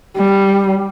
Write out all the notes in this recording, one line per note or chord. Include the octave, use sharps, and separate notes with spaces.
G3